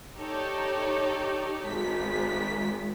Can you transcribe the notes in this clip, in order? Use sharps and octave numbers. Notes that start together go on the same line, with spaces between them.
D#4 G4 A4 C#5 D5
G#1 G#3 B6